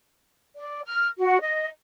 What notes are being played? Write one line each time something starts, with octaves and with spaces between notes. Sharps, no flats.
D5
F6
F#4
D#5